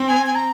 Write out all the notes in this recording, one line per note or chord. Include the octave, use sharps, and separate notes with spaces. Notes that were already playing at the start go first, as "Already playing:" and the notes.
Already playing: C4
G#5
G#5
A#5